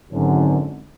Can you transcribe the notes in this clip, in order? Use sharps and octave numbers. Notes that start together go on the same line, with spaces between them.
G#1 F#2 D3